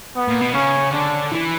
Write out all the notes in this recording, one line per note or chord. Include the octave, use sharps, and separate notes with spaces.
B3
A#2
B2
C#3 C#4
D3 D4
E3